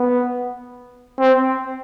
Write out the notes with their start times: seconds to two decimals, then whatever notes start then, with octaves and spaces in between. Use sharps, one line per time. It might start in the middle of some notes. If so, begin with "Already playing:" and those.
Already playing: B3
1.19 C4